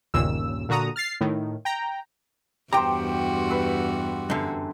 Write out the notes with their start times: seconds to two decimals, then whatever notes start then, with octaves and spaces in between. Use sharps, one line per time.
0.14 G1 D#2 A#2 C#3 E6
0.69 A#2 D3 F#4 A#5 D#6
0.96 F6 A6 C7
1.21 A2 D#3
1.65 G5 A#5
2.73 E2 G2 F#4 G4 C5 G5 A#5
3.50 B4 C6 E6
4.30 F#2 D3